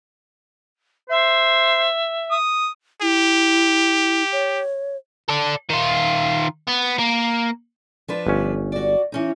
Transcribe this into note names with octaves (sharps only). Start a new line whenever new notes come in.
C5 E5
D#6
E4 G4
C#5
A4 D5
D#3 F4
B3
A#3
F3 D4 B4
G1 C#4
F#4 D5
E3 C#4 D#4